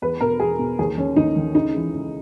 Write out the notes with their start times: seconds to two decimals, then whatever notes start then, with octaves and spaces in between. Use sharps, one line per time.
0.02 E2 B4
0.21 B2 A#4
0.40 E2 G#4
0.59 B2
0.79 D#2 G#4
0.98 D#3 C#4
1.16 D#2 D#4
1.36 D#3
1.55 C#2 D#4
1.74 C#3 E3
1.94 C#2